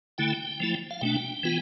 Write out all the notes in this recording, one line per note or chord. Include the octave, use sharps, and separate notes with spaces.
D3 A3 E4 G5
F3 A3 E4
F5
B2 A3 D4 G5
E3 B3 F4